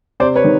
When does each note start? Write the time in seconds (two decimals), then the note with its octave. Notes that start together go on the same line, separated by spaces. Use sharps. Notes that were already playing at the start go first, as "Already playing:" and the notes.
0.20 C3 C5 D5
0.36 B4 C#5
0.44 D#3